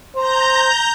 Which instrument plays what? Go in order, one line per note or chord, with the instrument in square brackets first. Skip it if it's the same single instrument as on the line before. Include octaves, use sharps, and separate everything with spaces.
[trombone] C5 [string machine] A#5 G6